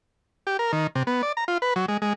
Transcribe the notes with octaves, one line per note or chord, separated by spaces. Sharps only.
G4
A#4
D#3
C3
B3
D5
A#5
F4
B4
F#3
G#3
G#3